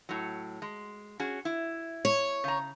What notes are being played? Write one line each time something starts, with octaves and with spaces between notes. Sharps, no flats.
A2 F#3
G#3
C#4 F#4 G#4
E4
C#5
C#3 A#5